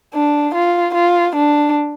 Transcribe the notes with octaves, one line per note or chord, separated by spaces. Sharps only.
D4
F4
F4
D4